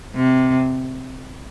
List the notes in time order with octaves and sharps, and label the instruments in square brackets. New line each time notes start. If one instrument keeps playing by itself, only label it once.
[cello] C3